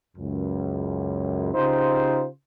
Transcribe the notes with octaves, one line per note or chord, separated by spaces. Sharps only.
C#2 F#2
C#3 D#4 F4 G4 C5